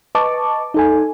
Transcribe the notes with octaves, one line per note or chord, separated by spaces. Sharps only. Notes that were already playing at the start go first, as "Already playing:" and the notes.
B4 D#5 A5 C#6 D6
D#4 A4 G#5